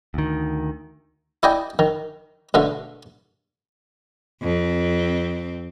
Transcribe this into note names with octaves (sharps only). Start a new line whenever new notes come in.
D2 D#3
E4 D5 D#5 G5 G#5
D#3
B2 D3 A3
F2 C4